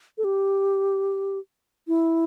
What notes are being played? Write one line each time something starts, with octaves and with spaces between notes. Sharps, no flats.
A4
G4
E4